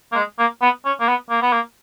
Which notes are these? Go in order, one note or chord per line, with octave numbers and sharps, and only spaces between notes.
A#3
G#3
A#3
B3
C#4
A#3
B3
A#3
B3
A#3